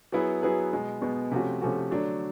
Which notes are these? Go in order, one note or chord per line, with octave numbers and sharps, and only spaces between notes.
F#3 B3 E4 G#4 B4
F#3 B3 E4 G#4 B4
B2 G#3 B3
B2 G#3 B3
C3 F3 A3 C#4 F#4
C3 F3 A3 C#4 F#4
D3 F#3 A3 D4